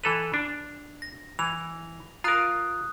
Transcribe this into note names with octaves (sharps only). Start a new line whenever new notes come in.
E3 A4 B4 F7
D4
A#6
E3 F7
F4 A#4 A#5 D#6 F#6